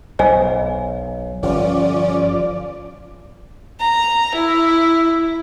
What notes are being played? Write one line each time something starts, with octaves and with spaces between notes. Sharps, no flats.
B1 C5 D#5 G#5
G1 F3 C#4 D5
A#5
E4